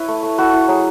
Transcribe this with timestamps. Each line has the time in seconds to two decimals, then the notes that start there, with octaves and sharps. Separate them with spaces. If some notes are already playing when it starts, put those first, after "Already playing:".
Already playing: E4 B4 C#5
0.08 A3
0.23 A3
0.38 E4 F#4 A4
0.53 E4
0.68 F#3 G#4